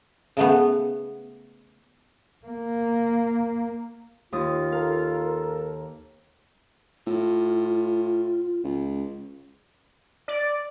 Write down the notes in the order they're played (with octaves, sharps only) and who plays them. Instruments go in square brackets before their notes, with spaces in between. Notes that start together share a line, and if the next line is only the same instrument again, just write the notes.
[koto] C#3 A3 B3
[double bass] A#3
[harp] D#2 D#6 [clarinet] F4
[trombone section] A4 A#4 [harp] F5
[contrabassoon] A2 [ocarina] F4
[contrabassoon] C#2
[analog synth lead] D5